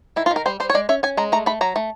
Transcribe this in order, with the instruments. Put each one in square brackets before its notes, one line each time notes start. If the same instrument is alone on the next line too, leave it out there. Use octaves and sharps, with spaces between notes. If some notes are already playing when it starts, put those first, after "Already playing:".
[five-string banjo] D#3 E4
F4
D#3
A#4
G3 C5
G3 C5
C#5
G#3 D5
C#4 E5
C#4 G#5
G#3 A#5
A3 A#5
A3 B5
F#3 A#5
A3